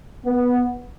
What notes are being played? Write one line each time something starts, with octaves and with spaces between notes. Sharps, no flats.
B3